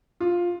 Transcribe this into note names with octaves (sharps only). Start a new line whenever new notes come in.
F4